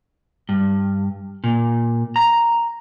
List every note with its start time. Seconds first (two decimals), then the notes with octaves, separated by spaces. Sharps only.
0.49 G2
1.44 A#2
2.16 A#5